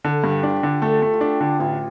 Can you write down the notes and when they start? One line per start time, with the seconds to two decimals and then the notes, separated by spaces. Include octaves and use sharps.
0.04 D3 A4
0.24 G2
0.30 G4
0.43 D4
0.49 F4
0.56 G4
0.63 D3
0.82 A3 A4
1.02 A3
1.14 F4
1.21 D4 G4
1.41 D3
1.60 A1 F4